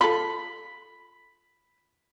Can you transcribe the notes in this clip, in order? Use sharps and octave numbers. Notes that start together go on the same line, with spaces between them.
F4 A4 B5